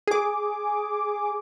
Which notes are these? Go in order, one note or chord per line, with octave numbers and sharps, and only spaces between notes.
G#4 D6